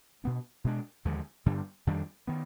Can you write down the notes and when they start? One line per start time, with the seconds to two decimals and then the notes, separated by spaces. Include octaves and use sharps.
0.24 B2 B3 D4
0.64 B2 G#3 D4
1.05 D#2 D3 F3 G#3
1.46 G2 D3 G3 D4
1.87 F2 D#3 G3 D4
2.27 D#3 B3